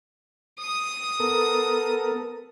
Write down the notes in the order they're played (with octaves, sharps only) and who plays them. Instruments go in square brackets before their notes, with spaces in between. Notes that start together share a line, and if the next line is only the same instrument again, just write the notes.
[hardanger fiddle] D#6
[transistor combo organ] B3 A4 A#4